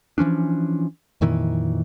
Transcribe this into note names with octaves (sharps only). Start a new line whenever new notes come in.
E3 F3 C#4 D4
F2 A#2 D#3 E3